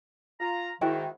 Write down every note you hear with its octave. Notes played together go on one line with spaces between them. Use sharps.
F4 A#5
G#2 D#3 E4 F#4 G5